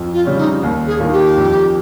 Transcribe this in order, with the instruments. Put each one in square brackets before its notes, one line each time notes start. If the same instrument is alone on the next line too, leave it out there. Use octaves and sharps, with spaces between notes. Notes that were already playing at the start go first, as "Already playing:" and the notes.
Already playing: [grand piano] F2
[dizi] F4
[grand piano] C#3 G3 C#4
[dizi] D#4
[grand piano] D#2
[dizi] G#4
[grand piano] D#3 A#3 F4
[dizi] G4
[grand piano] F2